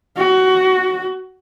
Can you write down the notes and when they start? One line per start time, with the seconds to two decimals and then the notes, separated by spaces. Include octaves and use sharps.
0.17 F#4